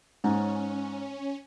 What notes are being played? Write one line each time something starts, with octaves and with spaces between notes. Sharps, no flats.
G#2 C#4